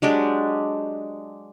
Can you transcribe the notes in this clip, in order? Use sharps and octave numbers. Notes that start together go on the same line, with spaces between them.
F#3 G#3 D4 G4